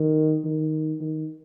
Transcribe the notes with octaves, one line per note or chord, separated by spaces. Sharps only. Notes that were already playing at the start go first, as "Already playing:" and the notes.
Already playing: D#3
D#3
D#3